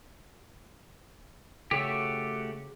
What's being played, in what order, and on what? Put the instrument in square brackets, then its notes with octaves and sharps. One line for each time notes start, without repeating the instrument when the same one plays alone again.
[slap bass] C#3 [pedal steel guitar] A3 F#4 G4